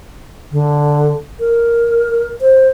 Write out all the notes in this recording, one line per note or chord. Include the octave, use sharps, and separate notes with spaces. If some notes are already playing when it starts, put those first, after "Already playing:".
D3
A#4
C5